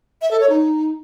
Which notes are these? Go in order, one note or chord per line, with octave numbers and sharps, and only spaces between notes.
E5
A4
C#5
D#4